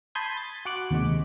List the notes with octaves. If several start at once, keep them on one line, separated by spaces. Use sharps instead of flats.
A5 B5 C6 D#6 G6 G#6
A6
F#4 F#5 D6 F#6
D#2 C3 G#3